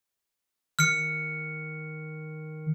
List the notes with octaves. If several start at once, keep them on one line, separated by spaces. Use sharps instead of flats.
D#3 F6 C#7